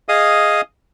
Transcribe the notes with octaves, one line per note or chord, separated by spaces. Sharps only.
G#4 D#5 F5 D#6